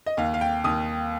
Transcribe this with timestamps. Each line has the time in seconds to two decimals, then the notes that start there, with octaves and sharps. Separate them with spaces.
0.06 D#5
0.17 D#2 F5
0.34 F5
0.41 G5
0.64 D#2 D#6